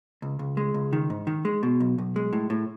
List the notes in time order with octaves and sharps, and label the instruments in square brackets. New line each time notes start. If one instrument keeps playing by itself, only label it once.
[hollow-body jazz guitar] C#2
C#2
G#3
C#2
D#3
G#2
D#3
G#3
B2
B1
B1
G#3
A2
A2